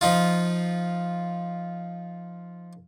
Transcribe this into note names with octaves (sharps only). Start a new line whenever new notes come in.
F3 D#4 F4